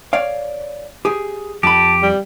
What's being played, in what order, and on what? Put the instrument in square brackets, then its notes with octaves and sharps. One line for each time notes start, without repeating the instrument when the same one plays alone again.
[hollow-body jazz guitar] C#5 D5 F5
G4 G#4
[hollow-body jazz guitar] F2 B5 [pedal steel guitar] G4 [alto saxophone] A5
[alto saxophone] G3